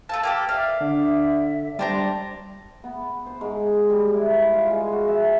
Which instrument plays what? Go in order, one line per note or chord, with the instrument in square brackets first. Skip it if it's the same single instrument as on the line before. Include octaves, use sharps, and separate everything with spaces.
[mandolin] A3 A4 A5 [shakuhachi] F5
[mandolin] A#3 G4 A4 [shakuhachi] B4
[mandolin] D5 F5 [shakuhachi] E5
[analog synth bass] D3
[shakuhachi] E5
[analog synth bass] G3 [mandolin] D4 C5 A#5
[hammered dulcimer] B3
C5
G#2
G3
E4
B4
F4
G#3
F#4
E5
G#4